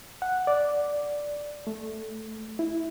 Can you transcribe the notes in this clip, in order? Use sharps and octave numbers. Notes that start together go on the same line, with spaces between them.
F#5
D5
A3
E4